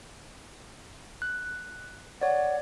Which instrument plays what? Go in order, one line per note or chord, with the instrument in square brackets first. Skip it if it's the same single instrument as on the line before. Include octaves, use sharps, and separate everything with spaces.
[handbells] F#6
[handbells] C#5 D5 [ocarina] F#5